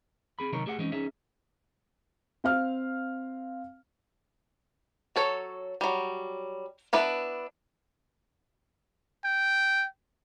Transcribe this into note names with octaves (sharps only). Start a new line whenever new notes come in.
C4 G#4 B5
C3 D#3 F#3 D#4 A#4 C#5
A3 G4 G#4 C#5 F#5
E3 G#3 C4 C#4 D#4
C#4 D#4 G#4 C#5 E5
C4 F5 F6
F#3 A4 C#5
F#3 G3
B3 D4 E4 B4
G5